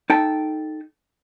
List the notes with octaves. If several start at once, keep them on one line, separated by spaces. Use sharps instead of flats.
D#4 A4 G5 A5